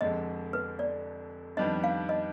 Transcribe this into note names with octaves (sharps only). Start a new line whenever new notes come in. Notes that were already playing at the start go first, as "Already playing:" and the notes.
F1 F2 D3 G#3 D#5
B4
D5
F2 D#3 G3 B3 D4 D#5
F5
D#5